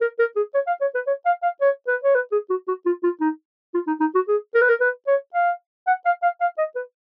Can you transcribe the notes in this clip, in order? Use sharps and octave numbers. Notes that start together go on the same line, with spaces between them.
A#4
A#4
G#4
C#5
F5
C#5
B4
C#5
F5
F5
C#5
B4
C#5
B4
G#4
F#4
F#4
F4
F4
D#4
F4
D#4
D#4
F#4
G#4
A#4
B4
A#4
B4
C#5
F5
F#5
F5
F5
F5
D#5
B4